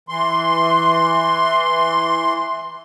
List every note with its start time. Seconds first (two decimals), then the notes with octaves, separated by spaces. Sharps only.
0.09 E3 C6